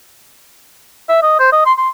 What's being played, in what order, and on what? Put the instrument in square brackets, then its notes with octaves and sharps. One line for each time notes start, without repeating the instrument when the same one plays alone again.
[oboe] E5
D#5
C5
D#5
C6
C6